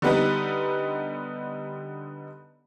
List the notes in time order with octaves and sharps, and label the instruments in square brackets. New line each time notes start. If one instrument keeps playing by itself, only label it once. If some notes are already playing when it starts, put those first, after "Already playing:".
[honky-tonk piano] D3 G3 B3 D#4 B4